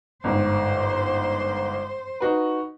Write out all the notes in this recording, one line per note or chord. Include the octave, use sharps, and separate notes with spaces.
G1 G#2 C5
D#4 F#4 B4